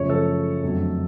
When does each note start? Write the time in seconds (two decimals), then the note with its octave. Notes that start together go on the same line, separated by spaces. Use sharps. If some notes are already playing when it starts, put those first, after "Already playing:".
Already playing: F#2 C#3 F3 A3 C#5
0.10 A4
0.63 F2 D3 F#3 A3